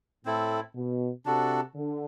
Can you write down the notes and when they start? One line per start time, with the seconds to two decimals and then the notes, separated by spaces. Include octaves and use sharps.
0.25 A2 C4 E4 A4
0.75 B2
1.25 C3 D4 F#4 A4
1.76 D3